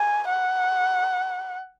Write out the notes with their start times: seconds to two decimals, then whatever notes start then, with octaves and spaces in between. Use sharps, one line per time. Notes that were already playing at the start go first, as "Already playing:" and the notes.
Already playing: G#5
0.29 F#5